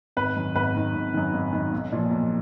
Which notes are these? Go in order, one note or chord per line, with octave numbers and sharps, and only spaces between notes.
G#1 B4
F#2 D#3
G#1 B4
F#2 D#3
G#1
F#2 D#3
G#1
F#2 D#3
B1
A#2 F3
B1